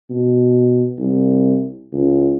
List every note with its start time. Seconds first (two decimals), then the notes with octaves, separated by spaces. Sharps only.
0.10 B2
0.98 C2
1.93 C#2